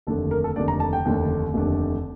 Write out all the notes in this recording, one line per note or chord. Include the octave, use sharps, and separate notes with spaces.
F1 D#2 D3 A3 D4 A4
A#4
A4
F1 D#2 D3 A3 D4 D5
A#5
A5
G5
F1 D#2 D3 A3 D4
F1 D#2 D3 A3 D4